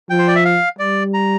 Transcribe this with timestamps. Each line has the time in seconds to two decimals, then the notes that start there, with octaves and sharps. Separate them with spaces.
0.10 F3 G5
0.19 C5
0.28 D5
0.35 E5
0.45 F5
0.79 G3 D5
1.14 A#5